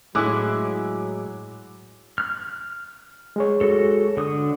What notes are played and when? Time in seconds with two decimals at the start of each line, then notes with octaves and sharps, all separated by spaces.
0.15 A2 F#3 G#3 C#4 E4 D6 E6 F#6
2.18 F6 F#6
3.36 G#3 G#4 C#5
3.61 F#4 A4
4.17 D3 D#6